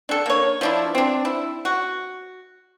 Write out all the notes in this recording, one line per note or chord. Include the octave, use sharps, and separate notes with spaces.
D4 A4
A#3 C#5
F3 D4 E4
C4 D4
E4
F#4